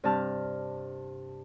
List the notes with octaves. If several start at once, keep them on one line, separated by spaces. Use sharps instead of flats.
G2 C3 G3 G4 A5 F6